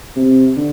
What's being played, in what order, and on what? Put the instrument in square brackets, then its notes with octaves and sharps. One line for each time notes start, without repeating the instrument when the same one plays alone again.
[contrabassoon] C3
D3